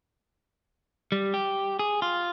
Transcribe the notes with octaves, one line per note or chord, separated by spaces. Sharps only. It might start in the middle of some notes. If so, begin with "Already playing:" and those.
G3
G4
G#4
F4